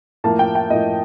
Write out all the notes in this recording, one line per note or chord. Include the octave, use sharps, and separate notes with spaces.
A2 F3 A#3 A5
G5
G5
A2 F3 A#3 D#5